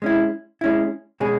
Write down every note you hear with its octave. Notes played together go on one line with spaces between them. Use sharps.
G#3 C#4 E4
G#3 C#4 E4
B2 G#3 C#4 G#4